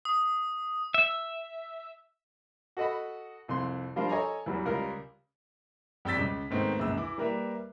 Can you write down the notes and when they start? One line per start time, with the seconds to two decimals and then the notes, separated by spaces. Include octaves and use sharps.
0.05 D#6
0.94 E5
2.77 F#4 A4 D#5 F#5 B5
3.48 C2 F2 C6
3.96 F3 G3 D4 F4 A#4
4.09 A4 C#5 D#5 G#5 A#5
4.46 E2 E3 F#3 G3
4.65 C#2 G3 F4 A#4
6.05 F2 G3 G5 E6 A6 B6
6.17 C#2 C#3
6.50 G#2 D#3 A3 B3 C4
6.79 C#2 F#2 A#2 G#3 E6
6.97 E3 E4 D6
7.18 G3 A#3 A#4 B4 E5